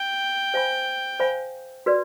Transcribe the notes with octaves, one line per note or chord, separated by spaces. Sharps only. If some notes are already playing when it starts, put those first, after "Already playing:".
Already playing: G5
C5 F5 G#5 B5
C5 F5 G#5 B5
F#4 B4 D5